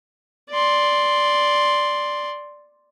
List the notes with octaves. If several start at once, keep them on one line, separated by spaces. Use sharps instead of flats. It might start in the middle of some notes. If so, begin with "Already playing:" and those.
D5 C6